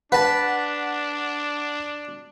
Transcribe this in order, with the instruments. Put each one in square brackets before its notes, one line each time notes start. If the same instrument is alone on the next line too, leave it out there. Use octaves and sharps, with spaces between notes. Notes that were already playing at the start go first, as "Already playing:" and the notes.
[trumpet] D4 [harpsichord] B4 A5 [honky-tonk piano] F#5